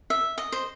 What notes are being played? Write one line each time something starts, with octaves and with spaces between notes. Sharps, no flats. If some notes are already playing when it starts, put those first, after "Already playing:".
E5
D#5
C5